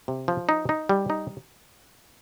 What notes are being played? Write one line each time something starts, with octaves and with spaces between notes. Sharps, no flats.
C3
F3
D#4
D#4
G3
D#4